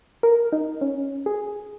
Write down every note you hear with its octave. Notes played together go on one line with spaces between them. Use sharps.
A#4
D#4
C#4
G#4